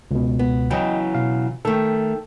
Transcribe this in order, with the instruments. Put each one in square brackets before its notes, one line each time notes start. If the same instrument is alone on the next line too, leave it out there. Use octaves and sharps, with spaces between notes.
[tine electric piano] C#2 B2
[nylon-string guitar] B3
[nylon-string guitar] C#3 E3 F#3 [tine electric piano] D#5 G5
[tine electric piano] B2 F5
[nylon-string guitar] D#3 A3 [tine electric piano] A4 G5